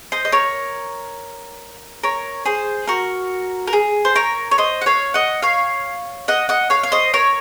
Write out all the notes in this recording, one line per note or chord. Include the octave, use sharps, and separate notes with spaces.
C5 D#5
D#5
A#4 C#5
A#4 C#5
G#4 C5
F#4 A#4
A#4
G#4
C5
A#4 C#5
C#5
C5 D#5
F#5
C#5 F5
D#5 F#5
C#5 F5
D#5 F#5
D#5 F#5
C#5 F5
F5
C5 D#5
A#4 C#5